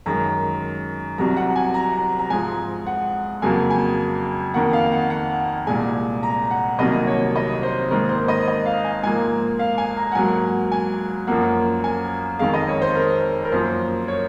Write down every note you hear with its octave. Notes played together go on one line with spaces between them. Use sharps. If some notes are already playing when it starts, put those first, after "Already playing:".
F#2 D#3 G#3 A#5
C2 C3 F#3 A#5
F#5
G#5
A#5
A#5
G#2 F3 G#3 G#5
F#5
F2 C#3 F#3 A#3 G#5
G#5
F2 D#3 A#3 F#5
F5
F#5
F#5
C2 A#2 G#3 G#5
A#5
F#5
C2 C3 D#3 F#3 A#3 D#5
C#5
D#5
C5
G#2 D#3 A#3 A#4
C5
D#5
D#5
F5
G#5
G#2 F3 A#3 G#5
F5
G#5
A#5
F#5
G#2 F#3 A#3 G#5
G#5
F#2 F3 A#3 F#5
G#5
F2 D#3 G#3 F5
D#5
C#5
C5
A#4
A#4
F#2 F3 A#3 C5
C#5